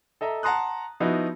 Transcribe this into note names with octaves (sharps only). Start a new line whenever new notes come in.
A4 D#5 E5 A#5
F#5 A5 A#5 C6 D#6 F#6
F3 B3 D#4 E4 F#4